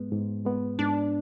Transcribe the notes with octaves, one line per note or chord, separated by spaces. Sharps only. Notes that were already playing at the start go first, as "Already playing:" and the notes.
Already playing: G#2 G#3 B3
G#2
G#3 B3
G#2 D4